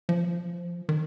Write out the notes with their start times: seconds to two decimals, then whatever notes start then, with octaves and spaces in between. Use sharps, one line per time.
0.09 F3
0.89 D#3